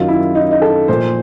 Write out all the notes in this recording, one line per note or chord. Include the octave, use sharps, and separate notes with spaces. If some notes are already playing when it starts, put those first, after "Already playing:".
Already playing: F#2 D#3 F#3 F4
E4
D#4
D#4
A4
A#2 F3 C5